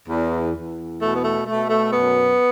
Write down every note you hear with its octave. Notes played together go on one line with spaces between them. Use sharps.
E2
E2
B2 A3
B3
A3
B2 A3
A3
F#2 B3